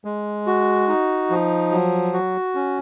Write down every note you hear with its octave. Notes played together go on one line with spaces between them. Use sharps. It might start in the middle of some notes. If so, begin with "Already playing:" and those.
G#3
F#4
D#4
F3
F#3
F#4
C#4